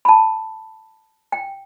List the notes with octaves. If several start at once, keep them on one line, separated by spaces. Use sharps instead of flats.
B5
A5
G5